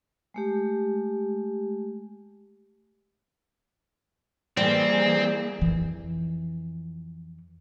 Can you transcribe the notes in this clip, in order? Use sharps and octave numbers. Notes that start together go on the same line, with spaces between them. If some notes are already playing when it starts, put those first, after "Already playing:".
G#3 A3 G4
E3 G3 A#3 C4 G#4
F2 E3